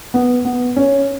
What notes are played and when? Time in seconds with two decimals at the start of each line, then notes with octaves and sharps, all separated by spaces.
0.14 B3
0.45 B3
0.76 C#4